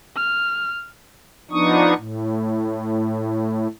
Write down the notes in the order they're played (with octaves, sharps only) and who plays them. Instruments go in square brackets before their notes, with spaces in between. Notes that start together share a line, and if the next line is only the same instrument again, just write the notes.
[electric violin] F6
[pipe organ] F3 B3 D4 D#4 C#6 D#6
A2